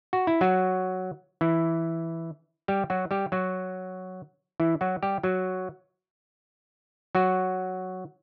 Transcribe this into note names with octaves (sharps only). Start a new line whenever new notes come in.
F#4
E4
F#3 F#4
E3 E4
G3 G4
F#3 F#4
G3 G4
F#3 F#4
E3 E4
F#3 F#4
G3 G4
F#3 F#4
F#3 F#4